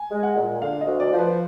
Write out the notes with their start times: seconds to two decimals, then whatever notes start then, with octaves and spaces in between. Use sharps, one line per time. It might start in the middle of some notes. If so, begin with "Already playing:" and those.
Already playing: G#5
0.11 G#3
0.23 F#5
0.36 A#2
0.61 D3 F5
0.81 D#5
0.86 D2
1.00 D5
1.12 F3
1.18 B4